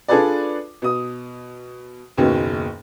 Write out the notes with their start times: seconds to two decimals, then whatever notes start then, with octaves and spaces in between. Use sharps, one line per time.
0.08 D4 F4 G#4 A4 B4 D5
0.82 B2 D#6
2.17 F#1 D#2 B2 C#4